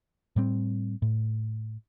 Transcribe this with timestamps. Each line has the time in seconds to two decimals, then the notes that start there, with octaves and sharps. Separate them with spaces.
0.36 A2 G3 C4
1.02 A2